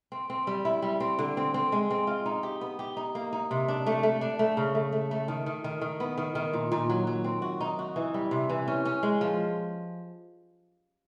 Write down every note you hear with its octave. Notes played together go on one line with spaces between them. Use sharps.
C4
C4
G3
E4
G3
C4
D3
C4
C4
G#3
C4
F4
D#4
G4
B3
G4
D#4
A#3
D#4
C3
D4
A3
A3
D4
A3
C#3
A3
A3
A3
D#3
D#3
D#3
D#3
B3
D#3
D#3
A#2
A#2
F#3
F#3
C4
F#4
D#4
F#4
E3
G3
C3
E3
C#4
C#4
G#3
F3